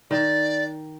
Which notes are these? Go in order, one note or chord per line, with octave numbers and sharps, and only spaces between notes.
D#3 D5